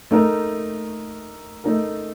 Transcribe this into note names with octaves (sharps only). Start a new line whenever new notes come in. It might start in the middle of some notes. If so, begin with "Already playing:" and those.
A3 D#4 A#4
A3 D#4 A#4